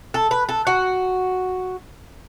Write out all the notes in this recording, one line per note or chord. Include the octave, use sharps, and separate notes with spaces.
A4
B4
A4
F#4